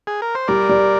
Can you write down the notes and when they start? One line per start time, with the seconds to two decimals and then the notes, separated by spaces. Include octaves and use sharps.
0.07 G#4
0.22 A#4
0.35 C5
0.48 G3 A#4 D5
0.69 G3